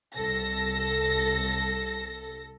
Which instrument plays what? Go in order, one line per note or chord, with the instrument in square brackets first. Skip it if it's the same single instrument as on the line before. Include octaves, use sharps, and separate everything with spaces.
[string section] C2 A4 A#6